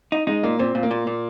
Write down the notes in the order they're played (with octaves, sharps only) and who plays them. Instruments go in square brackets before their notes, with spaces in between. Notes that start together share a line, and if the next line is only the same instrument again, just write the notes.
[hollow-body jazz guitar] D#4
[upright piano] G#3 [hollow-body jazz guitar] D#4
[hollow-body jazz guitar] A#2 [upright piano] A#3
[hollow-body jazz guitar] A#2 [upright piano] C4
[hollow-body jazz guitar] A#2
[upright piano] A#3
[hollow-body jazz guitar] A#2
A#2